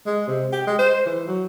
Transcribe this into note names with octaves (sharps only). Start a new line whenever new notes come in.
G#3
C3
G4
G#3
C5
E3
F#3